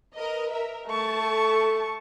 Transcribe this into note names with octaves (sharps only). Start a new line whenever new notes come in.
A#4 B4 D#5
A#4 E5
A3 A5 C#6
A4